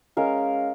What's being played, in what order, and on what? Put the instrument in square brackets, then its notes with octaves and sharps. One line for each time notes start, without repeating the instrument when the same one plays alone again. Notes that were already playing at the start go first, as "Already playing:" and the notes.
[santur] G#3 C#4 A#4 F5